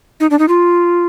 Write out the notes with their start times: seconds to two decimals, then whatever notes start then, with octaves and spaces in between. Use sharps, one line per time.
0.20 D#4
0.30 D4
0.39 D#4
0.48 F4